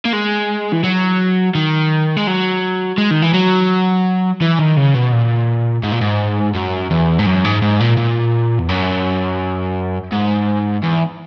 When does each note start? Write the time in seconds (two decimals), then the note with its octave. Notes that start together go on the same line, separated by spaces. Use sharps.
0.05 A#3
0.13 G#3
0.72 E3
0.83 F#3
1.55 D#3
2.17 G#3
2.27 F#3
2.98 G#3
3.11 D#3
3.22 E3
3.33 F#3
4.41 E3
4.59 D#3
4.77 C#3
4.94 B2
5.12 A#2
5.83 G#2
5.92 A#2
6.01 G#2
6.55 F#2
6.91 E2
7.19 G#2
7.26 F#2
7.45 G#2
7.62 G#2
7.81 A#2
7.97 A#2
8.59 E2
8.69 F#2
10.12 G#2
10.83 E2